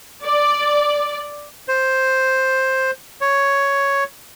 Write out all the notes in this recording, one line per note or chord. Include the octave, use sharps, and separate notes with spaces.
D5
C5
C#5